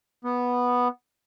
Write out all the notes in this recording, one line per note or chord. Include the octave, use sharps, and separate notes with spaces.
B3